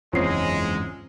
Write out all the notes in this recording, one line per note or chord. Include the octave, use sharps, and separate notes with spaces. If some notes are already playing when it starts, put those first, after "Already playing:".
F#1 E2 G#2 G#3 C4 C#4 F4 C7